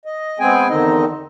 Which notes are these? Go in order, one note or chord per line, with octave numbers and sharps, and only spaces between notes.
D#5
G#3 B3 C4 G#4 G5 G#5
E2 D3 D#3 C4 D#4 D#5